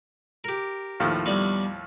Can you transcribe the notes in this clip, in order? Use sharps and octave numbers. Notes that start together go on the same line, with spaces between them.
G4 A#4
D#2 A2 F3
G3 B3